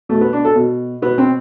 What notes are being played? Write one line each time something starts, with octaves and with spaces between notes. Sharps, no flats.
B2 A3
B3
D4
A4
B2
B2 B3
C4